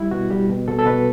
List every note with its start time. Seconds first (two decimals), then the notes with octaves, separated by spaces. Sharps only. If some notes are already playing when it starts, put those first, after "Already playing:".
Already playing: G3 E4
0.11 B2 F#4
0.30 G3 G4
0.49 B2
0.68 B2 A4
0.79 A4
0.86 B2 B4